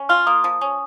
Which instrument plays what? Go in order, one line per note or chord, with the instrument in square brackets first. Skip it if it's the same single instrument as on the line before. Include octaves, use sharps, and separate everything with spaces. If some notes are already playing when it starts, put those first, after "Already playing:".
Already playing: [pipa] C#4
[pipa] F4 [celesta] F6
[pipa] A#3 [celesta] D#6
[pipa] F3
C#4